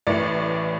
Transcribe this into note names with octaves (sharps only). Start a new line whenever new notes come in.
A1 A2 E3 D5